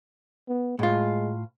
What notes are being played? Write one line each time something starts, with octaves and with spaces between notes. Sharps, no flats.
B3
A2 G#3 F4